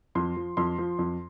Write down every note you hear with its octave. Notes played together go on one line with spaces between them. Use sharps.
F2 C6
F3
F2 C6
F3
F2